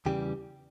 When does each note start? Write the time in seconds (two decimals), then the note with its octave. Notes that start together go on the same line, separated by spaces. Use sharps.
0.06 E2 C#3 E3 G3 G4